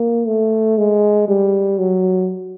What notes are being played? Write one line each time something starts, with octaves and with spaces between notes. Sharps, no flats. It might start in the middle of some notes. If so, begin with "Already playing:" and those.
Already playing: A#3
A3
G#3
G3
F#3